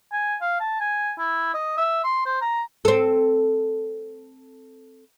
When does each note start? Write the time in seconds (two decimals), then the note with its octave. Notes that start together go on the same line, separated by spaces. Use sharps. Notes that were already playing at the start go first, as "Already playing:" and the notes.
0.12 G#5
0.41 F5
0.60 A5
0.80 G#5
1.18 E4
1.54 D#5
1.77 E5
2.04 C6
2.26 C5
2.41 A#5
2.85 C4 A4